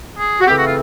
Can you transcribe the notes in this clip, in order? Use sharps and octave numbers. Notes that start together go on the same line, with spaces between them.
G#4
F#4
C#3 E3 A3 C4 G4
F#4
F4